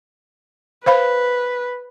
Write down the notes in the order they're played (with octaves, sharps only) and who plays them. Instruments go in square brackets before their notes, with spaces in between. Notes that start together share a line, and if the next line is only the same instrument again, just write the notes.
[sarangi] B4 [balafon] C5 F5 B5